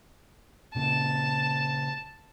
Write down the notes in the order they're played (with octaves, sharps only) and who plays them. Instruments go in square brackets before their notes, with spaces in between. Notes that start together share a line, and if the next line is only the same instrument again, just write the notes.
[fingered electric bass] A#2 C#3 A#3 [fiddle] A5